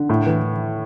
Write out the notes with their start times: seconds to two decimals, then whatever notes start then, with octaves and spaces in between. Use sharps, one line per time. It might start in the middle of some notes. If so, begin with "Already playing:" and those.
Already playing: D3
0.09 A2
0.26 E3